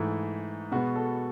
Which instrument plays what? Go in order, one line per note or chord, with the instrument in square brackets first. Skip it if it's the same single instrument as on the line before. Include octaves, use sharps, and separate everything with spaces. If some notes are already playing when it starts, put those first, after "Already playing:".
Already playing: [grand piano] G#2 E3 A3 E4
B2 G#3 B3 F#4
A4